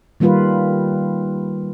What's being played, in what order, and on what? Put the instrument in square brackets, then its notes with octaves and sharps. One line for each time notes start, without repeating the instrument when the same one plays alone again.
[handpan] D#3 G3 A#3 F4 B4